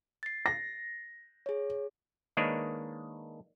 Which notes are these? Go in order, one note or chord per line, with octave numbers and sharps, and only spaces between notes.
A6 C7
A#6
G#4 C#5
D#3 G#3 A#3 D4 B4 C#5